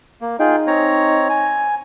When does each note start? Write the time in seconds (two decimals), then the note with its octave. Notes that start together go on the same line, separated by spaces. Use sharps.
0.21 A#3
0.40 D#4 F4 G#4 G5
0.67 C4 C#5 A#5
1.29 G#5